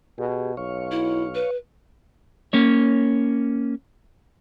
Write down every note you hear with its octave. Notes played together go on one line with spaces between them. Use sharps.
B2 G4 G#4
B1 C#5 F5 C#6
E4
B4
A#3 C#4 C#5